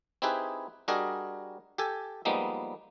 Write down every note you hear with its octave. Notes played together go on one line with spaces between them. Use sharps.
C4 D#4 E4 G4 G#4 B4
G3 D4 F#4 G#4 A#4 D#5
G4 A4 G#5
F3 G3 G#3 A#3 B3 D#4